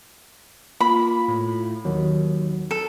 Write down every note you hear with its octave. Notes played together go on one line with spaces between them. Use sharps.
A#3 F4 B5
A2
D#2 D#3 F#3
A4